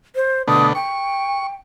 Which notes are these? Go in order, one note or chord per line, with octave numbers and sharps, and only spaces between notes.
C5
B2 D3 A3 D#6
G5 C#6